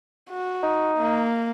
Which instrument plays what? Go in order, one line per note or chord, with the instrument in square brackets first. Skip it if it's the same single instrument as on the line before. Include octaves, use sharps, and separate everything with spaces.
[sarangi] F#4
[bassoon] D#4
[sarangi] A#3